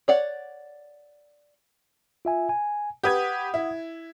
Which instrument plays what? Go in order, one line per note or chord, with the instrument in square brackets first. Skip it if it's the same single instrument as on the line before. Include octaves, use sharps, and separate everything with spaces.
[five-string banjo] C#5 D5 F#5
[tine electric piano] F4 E5 G#5
G#5
[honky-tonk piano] G4 B4 G#6 [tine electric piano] F#5 D#6
[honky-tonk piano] E4